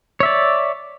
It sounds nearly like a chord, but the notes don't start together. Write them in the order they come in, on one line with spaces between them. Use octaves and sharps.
C#5 E5 D5